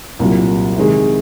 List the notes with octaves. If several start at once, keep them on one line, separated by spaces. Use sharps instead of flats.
C2 A#2 F#3
C3 D#3 G#3